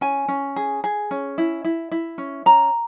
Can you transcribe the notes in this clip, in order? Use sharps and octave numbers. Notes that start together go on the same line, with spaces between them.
C#4 G#5
C#4
G#4
G#4
C#4
E4
E4
E4
C#4
C#4 A#5